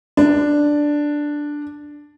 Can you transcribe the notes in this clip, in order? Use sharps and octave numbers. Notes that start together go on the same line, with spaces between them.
D4